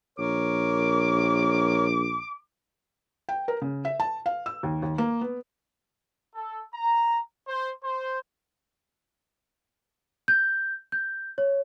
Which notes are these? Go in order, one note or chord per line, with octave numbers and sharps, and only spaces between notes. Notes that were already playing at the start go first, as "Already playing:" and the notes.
A#1 A#4 C#5 D6
G5
A#4
C#3
E5
A5
F5
E6
D#2
D#2
A#3
B3
A4
A#5
C5
C5
G6
G6
C#5